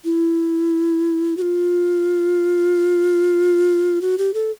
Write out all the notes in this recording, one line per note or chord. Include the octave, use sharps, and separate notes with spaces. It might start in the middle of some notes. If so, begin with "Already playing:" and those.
E4
F#4
F4
F#4
G4
A4